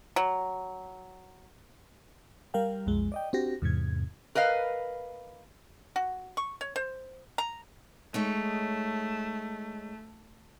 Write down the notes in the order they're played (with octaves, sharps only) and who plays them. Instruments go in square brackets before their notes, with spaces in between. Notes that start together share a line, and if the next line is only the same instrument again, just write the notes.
[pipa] F#3
[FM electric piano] G3 A#4 F5 G5
B1 F2 G#3
D5 D#5 G5
C4 D4 F#4 G4 A#6
E2 G#2 C3 G#6
[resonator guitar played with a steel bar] A#4 B4 D#5 F5
[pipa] F#4
C#6
C#5
C5
A#5
[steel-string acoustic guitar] G#3 D#4 C#5 [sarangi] A3